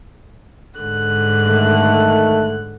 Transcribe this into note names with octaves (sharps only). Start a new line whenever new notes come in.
G#2 D3 F#6
D#3 A3